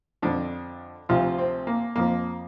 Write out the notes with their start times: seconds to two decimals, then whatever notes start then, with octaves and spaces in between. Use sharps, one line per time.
0.22 F2 D3 F3 D4
1.09 D2 C3 F3 F4
1.38 C4
1.67 A#3
1.96 F2 F3 A#3